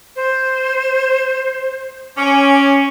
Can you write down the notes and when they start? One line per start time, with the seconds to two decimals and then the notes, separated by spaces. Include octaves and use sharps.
0.16 C5
2.17 C#4 D6